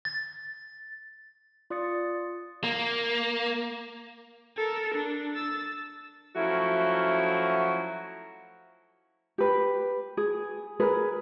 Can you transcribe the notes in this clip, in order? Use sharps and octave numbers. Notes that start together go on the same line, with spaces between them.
A6
F4 D5 D#6 A6 C#7
A#3
A4 A#4
D4
E6 A6
F3 F#3 A3 C#4 E4 F#4
G4 B4
G#4
G#4 A#4 B4